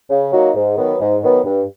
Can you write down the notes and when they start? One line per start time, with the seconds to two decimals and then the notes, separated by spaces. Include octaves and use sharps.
0.10 C#3
0.32 F#3 A#3 D#4 F#4
0.55 G#2
0.77 D#3 F#3 B3
1.00 G#2
1.23 D#3 F#3 B3
1.45 G2